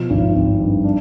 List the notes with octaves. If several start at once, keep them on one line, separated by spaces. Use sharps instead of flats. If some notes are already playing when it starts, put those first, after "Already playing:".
Already playing: B2 F3
G#1
G#1
G2
D4